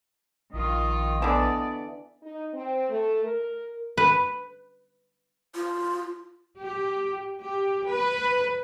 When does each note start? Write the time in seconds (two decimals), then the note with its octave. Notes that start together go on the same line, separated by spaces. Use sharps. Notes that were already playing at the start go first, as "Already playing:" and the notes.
0.53 A#1 D#3 F4 D#5
1.22 D3 E3 B3 D5
2.23 D#4
2.53 C4
2.90 A3
3.23 A#4
3.98 B4
5.55 F4
6.60 G4
7.42 G4
7.88 B4